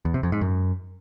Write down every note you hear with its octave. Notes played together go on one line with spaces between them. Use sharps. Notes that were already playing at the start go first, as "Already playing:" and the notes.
E2
C3
F2
G#2
F#2